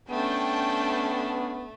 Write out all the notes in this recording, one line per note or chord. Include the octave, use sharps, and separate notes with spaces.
A3 B3 C#4 D4 G5 A5